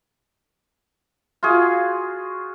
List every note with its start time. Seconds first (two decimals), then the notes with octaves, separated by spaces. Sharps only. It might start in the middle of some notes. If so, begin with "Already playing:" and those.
1.43 F4 F#4 G#4